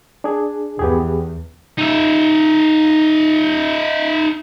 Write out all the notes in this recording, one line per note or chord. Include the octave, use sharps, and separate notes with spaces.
D4 G#4
E2 B3 G4 G#4
D#4 E5